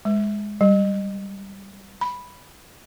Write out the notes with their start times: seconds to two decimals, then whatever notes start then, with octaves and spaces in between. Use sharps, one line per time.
0.05 G#3
0.61 G3
2.01 B5